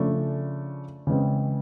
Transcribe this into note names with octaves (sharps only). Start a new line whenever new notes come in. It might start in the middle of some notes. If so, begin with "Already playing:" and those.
Already playing: C#3 F3 A3 D4
C#3 E3 G#3 C4